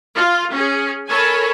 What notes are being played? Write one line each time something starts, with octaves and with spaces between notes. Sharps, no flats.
F4
C#4 G#4
A4 A#4 C#5 G#5 B5